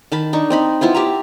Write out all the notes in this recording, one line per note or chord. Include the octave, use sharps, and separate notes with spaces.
D#3 A5 B5
D4 D#4 C#6
C4 D#4 B5
B3 E4 F4 C5
G4 E5 A#5